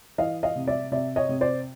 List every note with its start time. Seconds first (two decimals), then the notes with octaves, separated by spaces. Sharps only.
0.18 E3 D#5 F5
0.43 D#5 F5
0.56 C3
0.67 D5 E5
0.92 C3 D5 E5
1.16 C#5 D#5
1.29 C3
1.41 C5 D5